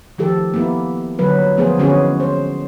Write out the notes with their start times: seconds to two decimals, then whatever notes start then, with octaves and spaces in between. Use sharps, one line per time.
0.18 D#3 F3 G4 A4
0.54 A#3 B3 E4
1.19 D3 F#3 B4
1.57 F3 A#3 B3 G#4 C5
1.78 D3 E3 G#3 C#4 F#4 G#4
2.20 C5